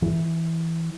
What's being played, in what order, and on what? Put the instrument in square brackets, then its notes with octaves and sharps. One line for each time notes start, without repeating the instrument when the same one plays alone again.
[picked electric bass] E3